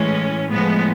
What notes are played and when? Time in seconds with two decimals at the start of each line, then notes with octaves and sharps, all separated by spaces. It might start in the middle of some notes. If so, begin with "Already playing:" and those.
Already playing: A2 E3 G#3 C#4
0.50 A2 F3 G#3 B3